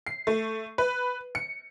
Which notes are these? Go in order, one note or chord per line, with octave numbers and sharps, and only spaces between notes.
C7
A3
B4
C#7